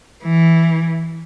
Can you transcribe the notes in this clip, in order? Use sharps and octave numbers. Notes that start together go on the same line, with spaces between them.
E3